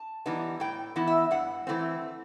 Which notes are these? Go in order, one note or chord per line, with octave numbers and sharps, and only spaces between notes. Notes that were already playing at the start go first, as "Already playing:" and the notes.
Already playing: A5
E3 G3 B3 D#4
A2 G5
E3 B3 E4
E5
G2 F#5
E3 A3 C4